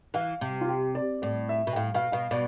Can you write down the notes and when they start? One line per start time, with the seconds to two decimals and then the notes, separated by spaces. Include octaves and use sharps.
0.14 E3 F5
0.41 C3
0.61 F4
0.69 G4
0.95 D5
1.22 A2 D5
1.49 E5
1.67 B2
1.73 G5
1.76 A2 F5
1.94 B2 F5
2.12 B2 F5
2.31 B2 D5